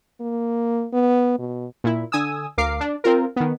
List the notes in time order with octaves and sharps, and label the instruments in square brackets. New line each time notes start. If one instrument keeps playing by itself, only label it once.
[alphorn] A#3
B3
B2
[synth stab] A#2 E4
D3 G#5 D#6 E6
D2 A#4 F5 D6 C7
D4
C4 F4 A#4
D#3 B3